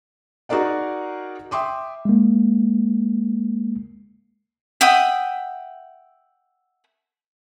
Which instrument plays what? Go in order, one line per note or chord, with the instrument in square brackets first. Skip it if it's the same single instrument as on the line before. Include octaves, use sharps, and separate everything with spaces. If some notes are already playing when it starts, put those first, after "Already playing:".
[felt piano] D#4 F#4 G#4 A#4 D5 F#5
E5 G5 C6 D6 D#6
[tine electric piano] G#3 A#3
[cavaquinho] E5 F#5 G5 D#6